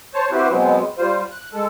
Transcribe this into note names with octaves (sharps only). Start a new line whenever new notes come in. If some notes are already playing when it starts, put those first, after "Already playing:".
C5 C#5 A5
C4 E4 F#4 G4 B4 C5
B2 F#3 G#3 B3 C4
G3 F4 C5
F#6
G#3 A4